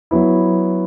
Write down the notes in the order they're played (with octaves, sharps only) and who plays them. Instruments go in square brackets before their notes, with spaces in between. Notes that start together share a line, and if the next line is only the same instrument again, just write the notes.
[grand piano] F#3 B3 E4